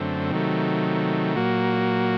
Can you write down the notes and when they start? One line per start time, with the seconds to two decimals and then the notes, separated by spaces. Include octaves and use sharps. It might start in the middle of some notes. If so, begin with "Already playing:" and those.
Already playing: F#2 D3 A3 C4
0.31 C3 D#3 F#3 A3
1.35 A#2 F#3 A#3 F#4